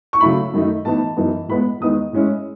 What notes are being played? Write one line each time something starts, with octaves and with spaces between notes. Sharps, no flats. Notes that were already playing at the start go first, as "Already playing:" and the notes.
C#6
C#3 F#3 A3 E4 B5
F#2 D#3 A3 D#4
A2 E3 B3 D#4 A5
F#2 E3 B3 D#4
A2 G#3 B3 B5
E2 D#3 G#3 B3 D#4 D#6
A2 G#3 C#4 E4